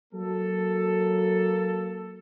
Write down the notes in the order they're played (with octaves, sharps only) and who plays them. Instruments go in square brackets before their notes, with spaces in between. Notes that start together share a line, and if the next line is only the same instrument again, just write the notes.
[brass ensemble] F#3 A#3 A4